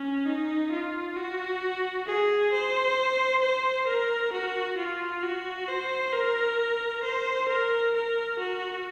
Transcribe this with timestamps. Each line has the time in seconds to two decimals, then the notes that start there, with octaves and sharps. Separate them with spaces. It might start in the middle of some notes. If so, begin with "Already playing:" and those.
Already playing: C#4
0.26 D#4
0.72 F4
1.17 F#4
2.07 G#4
2.52 C5
3.42 C5
3.87 A#4
4.33 F#4
4.78 F4
5.23 F#4
5.68 C5
6.13 A#4
7.03 C5
7.48 A#4
7.94 A#4
8.39 F#4